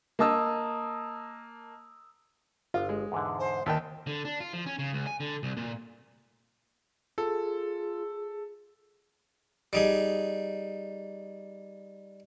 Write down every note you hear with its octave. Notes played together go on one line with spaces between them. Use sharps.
A#3 D#5 A5 D#6 E6
G1 F4
G#3
E2 G#2 D3
C5
D#2 D#3 B3 E4 G5 A5
D3
D4
F4
F3
C#4
C#3
C#2
G#5
D3
C2
A#2
F4 G#4 A4
G3 D#4 G#4